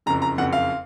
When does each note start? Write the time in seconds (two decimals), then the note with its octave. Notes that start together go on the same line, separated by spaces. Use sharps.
0.06 F#1 F2 C#3 A#5
0.22 A#5
0.38 F#1 F2 C#3 F#5
0.53 F5